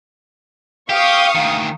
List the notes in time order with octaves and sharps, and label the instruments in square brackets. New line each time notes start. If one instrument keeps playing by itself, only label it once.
[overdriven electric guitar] G4 [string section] F5 C#6 D#6
[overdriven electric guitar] D2 D#3